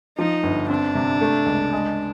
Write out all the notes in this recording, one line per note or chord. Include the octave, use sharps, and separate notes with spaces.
F3 D#4
G1
C4 D4
C3
A3
C#2
G#3